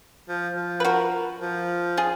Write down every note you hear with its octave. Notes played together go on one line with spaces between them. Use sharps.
F3
F3
B4
F#4 A#4
F3
F4 G#4